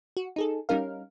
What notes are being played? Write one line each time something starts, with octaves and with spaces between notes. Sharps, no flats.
F#4
D#4 G#4 A4
G3 C#4 D#4 A#4 F5